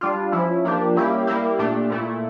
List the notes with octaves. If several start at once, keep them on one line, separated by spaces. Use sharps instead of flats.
G3 D4 F4
F3 C#4 E4
F3 A#3 D4 G4
G3 A#3 C#4 E4 G4
G3 A#3 E4 G4
A#2 A3 D4 G4
A#2 A3 E4